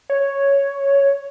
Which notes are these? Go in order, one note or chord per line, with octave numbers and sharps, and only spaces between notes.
C#5